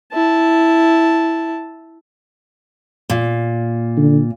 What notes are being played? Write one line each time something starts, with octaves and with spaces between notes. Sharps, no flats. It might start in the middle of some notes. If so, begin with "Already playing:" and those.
E4 A5
A#2
D3